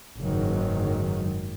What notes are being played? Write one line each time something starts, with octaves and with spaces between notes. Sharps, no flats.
F#1 G#2 D#3 F#3